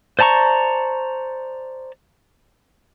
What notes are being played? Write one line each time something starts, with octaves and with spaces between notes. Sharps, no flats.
C5 D5 A5 A#5 C#6